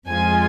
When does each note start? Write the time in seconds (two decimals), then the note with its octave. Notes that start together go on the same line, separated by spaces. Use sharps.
0.08 F2 F3 G#3 F4 G#5